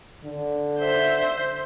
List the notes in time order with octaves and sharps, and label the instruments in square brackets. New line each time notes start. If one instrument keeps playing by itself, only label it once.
[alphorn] D3
[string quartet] C5 [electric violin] E5 G6